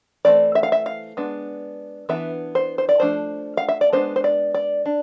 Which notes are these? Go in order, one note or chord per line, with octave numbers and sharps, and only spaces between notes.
E3 A3 C4 D5
E5
F5
E5
F5
G#3 B3 D4
E3 B3 D4 E5
C5
C5
D5
F3 A3 D4 C5
F5
E5
D5
G#3 B3 D4 C5
C5
D5
D5
D4